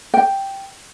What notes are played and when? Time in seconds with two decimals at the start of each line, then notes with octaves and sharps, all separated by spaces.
0.14 G5